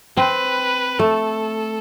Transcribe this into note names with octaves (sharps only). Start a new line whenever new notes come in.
C4 B4
A3 A4